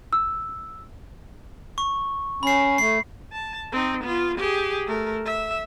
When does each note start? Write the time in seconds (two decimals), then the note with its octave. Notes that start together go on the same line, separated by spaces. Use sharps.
0.13 E6
1.78 C#6
2.43 C#4 B5 C7
2.78 A3 C7
3.33 A5
3.72 C4 D#4
4.03 B3 F4
4.38 G4 G#4
4.87 A3 A#4
5.26 E5